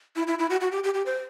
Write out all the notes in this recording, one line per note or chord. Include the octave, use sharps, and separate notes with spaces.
E4
E4
E4
F#4
F#4
G4
G4
G4
C5